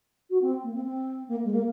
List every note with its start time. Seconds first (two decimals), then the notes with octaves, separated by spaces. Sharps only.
0.30 F#4
0.42 C4
0.63 A#3
0.74 C4
0.84 C4
1.28 A#3
1.44 G#3
1.52 A#3